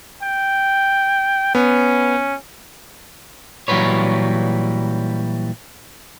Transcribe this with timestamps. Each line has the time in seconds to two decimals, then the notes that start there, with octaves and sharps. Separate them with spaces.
0.23 G5
1.55 B3 C#4
3.68 A#2 E3 F#3 G3 B4 C#5